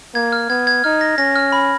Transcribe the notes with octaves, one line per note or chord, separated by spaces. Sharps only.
A#3 G#6
F6
B3 G#6
G#6
D#4 F6
A#6
C#4 A#6
F6
B5